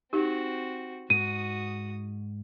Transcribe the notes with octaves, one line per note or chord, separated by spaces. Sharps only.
C4 D#4 F#4 G4
G#2 F#4 D#6 D#7